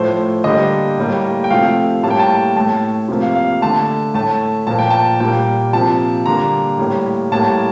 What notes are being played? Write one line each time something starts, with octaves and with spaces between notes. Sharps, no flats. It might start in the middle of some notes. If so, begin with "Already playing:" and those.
Already playing: A2 F3 A3 C5
D3 G3 A#3 D#5
A2 G3 A#3
G5
C3 F3 A3 F5
A2 G3 A#3 A5
G5
A5
A2 A3 A5
C3 F3 A#3
F5
F5
D3 A3 A5
A2 A3 A5
A#2 F3 A#3 A5
G5
A5
A#2 G3 A#3 G5
C3 F3 A#3 A5
D3 G3 A#3 A#5
A2 G3 A#3
A2 G3 A#3 A5